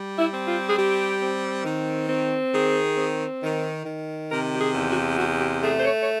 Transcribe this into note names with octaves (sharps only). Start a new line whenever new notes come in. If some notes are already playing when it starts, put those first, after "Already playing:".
Already playing: G3
E4
C4
F4
G#4
G3 G4
C4
D#3
C4
D#3 G#4
C4
D#3
D#3
C3 A#4
G4
G#4
E2
F#4
C3 F#4
G4
A3 G#4
C5
C#5
C#5